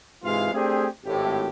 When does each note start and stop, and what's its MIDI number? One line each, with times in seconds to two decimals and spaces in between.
0.23 0.50 44
0.23 0.50 48
0.23 0.50 52
0.23 0.50 56
0.23 0.50 65
0.23 0.50 77
0.53 0.86 57
0.53 0.86 60
0.53 0.86 62
0.53 0.86 67
0.53 0.86 68
1.05 1.48 32
1.05 1.48 45
1.05 1.48 67